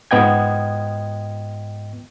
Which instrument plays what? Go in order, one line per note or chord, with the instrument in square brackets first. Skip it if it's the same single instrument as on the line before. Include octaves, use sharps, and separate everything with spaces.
[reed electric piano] G#2 B3 D#5 G5 G#6